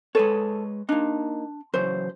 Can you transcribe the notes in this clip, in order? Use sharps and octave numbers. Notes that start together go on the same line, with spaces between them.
G#3 A4 B4 C#5
A#3 D4 D#4
C#3 E3 F#3 C5